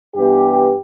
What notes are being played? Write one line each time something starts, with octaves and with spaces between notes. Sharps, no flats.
G2 E3 B3 G4